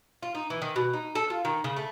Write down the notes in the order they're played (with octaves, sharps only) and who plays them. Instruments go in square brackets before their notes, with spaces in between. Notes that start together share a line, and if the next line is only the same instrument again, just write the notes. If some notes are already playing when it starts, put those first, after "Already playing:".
[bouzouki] F4
D#4
E3
D#3
B2
D#4
A4
F4
D#3
C#3
A3